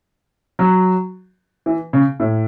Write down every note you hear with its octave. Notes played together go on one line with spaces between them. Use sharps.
F#3
E3
C#3
A2